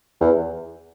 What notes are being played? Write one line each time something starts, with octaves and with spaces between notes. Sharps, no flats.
E2